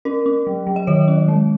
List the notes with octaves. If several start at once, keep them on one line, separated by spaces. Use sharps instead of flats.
C#4 A#4
C#4
F#3
F#3
D#5
D#3 C#5
C#4
G#3